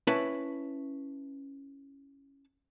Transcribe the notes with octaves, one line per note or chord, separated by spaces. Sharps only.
C#4 E4 B4 A5